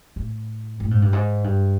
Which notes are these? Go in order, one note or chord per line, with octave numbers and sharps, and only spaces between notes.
A2
A2
G#2
G2
G#2
G2